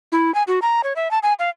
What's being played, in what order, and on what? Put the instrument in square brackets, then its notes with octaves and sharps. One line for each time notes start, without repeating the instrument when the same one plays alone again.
[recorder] E4
G#5
F#4
A#5
C#5
E5
A5
G#5
F5